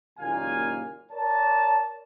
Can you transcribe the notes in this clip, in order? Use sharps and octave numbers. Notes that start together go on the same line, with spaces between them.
F#1 D#2 A#2 G#3 F5 G#5
A#4 C#5 D5 A5